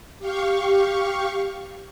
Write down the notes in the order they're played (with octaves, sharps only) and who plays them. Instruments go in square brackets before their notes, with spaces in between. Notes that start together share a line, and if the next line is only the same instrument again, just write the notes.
[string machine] G4 F5 C#6